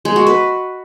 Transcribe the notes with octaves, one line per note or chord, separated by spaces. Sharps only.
G#3
F#4
B4